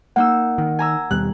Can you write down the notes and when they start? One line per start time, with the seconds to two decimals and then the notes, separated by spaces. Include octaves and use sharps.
0.16 A#3 D#4 F#5 E6
0.58 D#3
0.79 G#5 A#5 E6
1.11 D#2 B2 G3 F#6